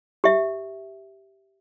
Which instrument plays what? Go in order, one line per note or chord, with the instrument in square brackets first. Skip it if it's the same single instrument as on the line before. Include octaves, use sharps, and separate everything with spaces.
[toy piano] G4 E5